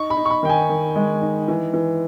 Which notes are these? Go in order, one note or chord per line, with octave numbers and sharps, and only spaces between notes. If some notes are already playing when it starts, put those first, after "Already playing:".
Already playing: D#4 C#6
B5
D#4
C#6
B5
D#3 G5
G#5
D#3
G#3
D#4
E3
E3